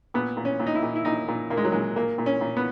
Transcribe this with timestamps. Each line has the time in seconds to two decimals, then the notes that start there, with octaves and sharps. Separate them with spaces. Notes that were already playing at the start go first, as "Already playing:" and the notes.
0.14 A#2 B3
0.37 A#2
0.45 C#4
0.60 A#2
0.67 D#4
0.75 E4
0.83 A#2
0.95 E4
1.05 A#2 D#4
1.28 A#2
1.50 A#2 A#3
1.57 G#3
1.65 F#3
1.72 A#2 G#3
1.96 A#2 A#3
2.18 A#2
2.26 C#4
2.41 A#2
2.57 B3